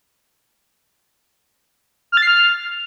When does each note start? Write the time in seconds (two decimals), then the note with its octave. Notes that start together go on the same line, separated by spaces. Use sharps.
2.12 F6
2.17 A6
2.22 C7
2.27 F6